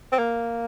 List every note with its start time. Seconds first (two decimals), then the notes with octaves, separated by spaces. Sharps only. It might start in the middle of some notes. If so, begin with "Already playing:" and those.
0.12 C4
0.19 A#3